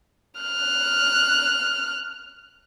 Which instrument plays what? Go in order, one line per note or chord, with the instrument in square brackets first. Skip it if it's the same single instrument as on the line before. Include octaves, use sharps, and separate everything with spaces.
[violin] F6 F#6